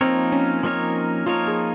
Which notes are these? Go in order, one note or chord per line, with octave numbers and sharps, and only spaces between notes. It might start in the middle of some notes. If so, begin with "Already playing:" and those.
F3 A#3 C4 D#4 A#4 C#5
C#4
F3 A#3 D#4 A#4 C#5
F3 A#3 D#4 F4 A#4 C#5
G#4